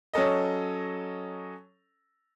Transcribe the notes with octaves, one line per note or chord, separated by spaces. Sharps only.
F#3 C#4 A4 D#5